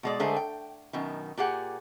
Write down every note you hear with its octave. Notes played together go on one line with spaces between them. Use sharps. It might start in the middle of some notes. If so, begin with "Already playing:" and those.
B2 G#3 D5
D3 G#3 A3 G#4 A#4 C5
G5
F#2 B2 D#3
A#2 G4 G#4 F#5